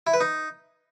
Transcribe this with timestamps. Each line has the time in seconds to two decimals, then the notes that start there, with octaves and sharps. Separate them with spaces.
0.07 E4
0.14 B4
0.21 D#4